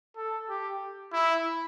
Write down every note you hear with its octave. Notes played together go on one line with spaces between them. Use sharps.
A4
G4
E4